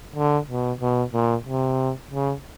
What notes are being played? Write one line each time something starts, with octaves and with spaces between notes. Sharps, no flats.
D3
B2
B2
A#2
C3
C#3